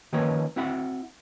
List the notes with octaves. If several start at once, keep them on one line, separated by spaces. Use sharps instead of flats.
D#3 F3 A#3 C#4 B4 C#5
C4 E4 F#4 E5 F#5